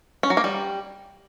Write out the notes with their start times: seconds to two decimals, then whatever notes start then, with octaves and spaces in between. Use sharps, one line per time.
0.23 C#4
0.30 F#3
0.37 A#3
0.44 G3